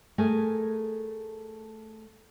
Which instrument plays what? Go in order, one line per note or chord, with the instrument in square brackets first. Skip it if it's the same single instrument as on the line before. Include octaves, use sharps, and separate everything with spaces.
[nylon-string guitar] A3 G#4 A#4 G#5